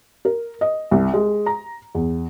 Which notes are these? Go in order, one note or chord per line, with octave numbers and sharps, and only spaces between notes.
A#4
D#5
C2
G#3
A#5
E2